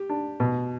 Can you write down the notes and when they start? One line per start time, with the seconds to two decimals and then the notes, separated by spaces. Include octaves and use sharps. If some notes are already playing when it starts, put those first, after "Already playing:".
Already playing: G4
0.09 D4
0.40 B2